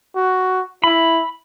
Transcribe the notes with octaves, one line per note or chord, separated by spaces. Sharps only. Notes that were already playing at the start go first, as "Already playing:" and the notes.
F#4
E4 B5